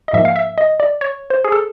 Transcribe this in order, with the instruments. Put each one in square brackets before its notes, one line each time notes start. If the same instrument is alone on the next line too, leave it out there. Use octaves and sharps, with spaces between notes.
[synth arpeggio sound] D#5
G#2 F3 A#3 E5
F5
E5
D#5
D5
C#5
C5
G#4
A4